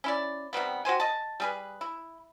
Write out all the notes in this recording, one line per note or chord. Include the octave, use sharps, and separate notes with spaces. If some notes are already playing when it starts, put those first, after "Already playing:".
C#4 E4 D5
C3 D#3 G3 B3
F#4 G4 C5 G#5
D#5 A5
G3 G#4 B4
E4